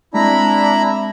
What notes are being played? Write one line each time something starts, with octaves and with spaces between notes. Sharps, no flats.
G#3 C4 D4 E4 A#5 B5